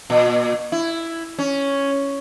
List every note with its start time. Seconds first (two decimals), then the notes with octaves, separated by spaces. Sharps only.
0.10 A#2
0.72 E4
1.39 C#4